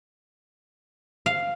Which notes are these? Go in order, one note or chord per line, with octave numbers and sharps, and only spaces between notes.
F5